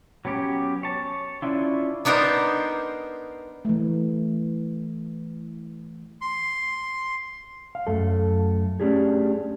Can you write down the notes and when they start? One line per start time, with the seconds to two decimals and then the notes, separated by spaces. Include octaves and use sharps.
0.25 F#3 B3 C#4 G4
0.83 C#5 A5
1.42 C#4 D4 E4 F4
2.05 B3 D4 D#4 A#4 C5
3.65 E3 A3
6.21 C6
7.75 F5
7.87 F#2 A3 A4
8.80 A3 C#4 D4 G4 G#4